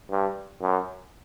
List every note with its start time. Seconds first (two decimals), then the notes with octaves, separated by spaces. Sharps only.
0.11 G2
0.61 F#2